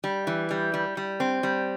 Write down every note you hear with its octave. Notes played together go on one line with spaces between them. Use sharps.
G3
E3
G3
G3
G3
C4
G3